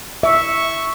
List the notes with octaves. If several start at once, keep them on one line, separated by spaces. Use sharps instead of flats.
E5 C#6